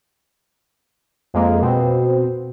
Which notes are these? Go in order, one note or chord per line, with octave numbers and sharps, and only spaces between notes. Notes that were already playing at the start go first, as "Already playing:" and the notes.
F2 G#3 A#3
B2 C4